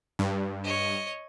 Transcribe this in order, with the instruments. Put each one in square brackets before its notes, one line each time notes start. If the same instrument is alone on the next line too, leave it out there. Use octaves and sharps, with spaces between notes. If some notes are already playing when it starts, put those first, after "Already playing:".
[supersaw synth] G2
[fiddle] C#5 D#5